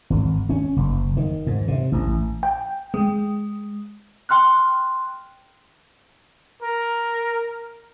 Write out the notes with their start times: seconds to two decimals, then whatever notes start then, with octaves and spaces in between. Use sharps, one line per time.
0.10 G#1
0.49 C#4
0.76 F#1
1.17 D#3
1.47 G#2
1.68 C3
1.92 A1
2.43 G5
2.94 G#3
4.29 G5 C6 F6 F#6
6.63 A#4